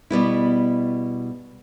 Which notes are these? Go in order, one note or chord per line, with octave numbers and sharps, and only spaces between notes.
B2 G3 B3 E4